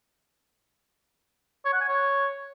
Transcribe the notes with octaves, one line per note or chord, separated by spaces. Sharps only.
C#5
F#5
G#5
C#5